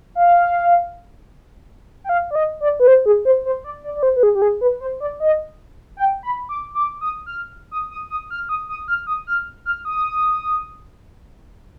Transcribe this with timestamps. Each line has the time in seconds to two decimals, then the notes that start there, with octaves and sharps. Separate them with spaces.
0.15 F5
2.04 G5
2.09 F5
2.31 D5
2.35 D#5
2.61 D5
2.80 B4
2.87 C5
3.06 G#4
3.25 C5
3.45 C5
3.64 D5
3.84 D5
3.96 D5
4.03 C5
4.16 B4
4.23 G#4
4.35 G4
4.42 G#4
4.61 B4
4.81 C5
5.00 D5
5.20 D#5
5.97 G5
6.23 B5
6.49 D6
6.75 D6
7.01 D#6
7.26 F6
7.71 D#6
7.91 D#6
8.10 D#6
8.30 F6
8.49 D#6
8.69 D#6
8.88 F6
9.07 D#6
9.27 F6
9.66 F6
9.85 D#6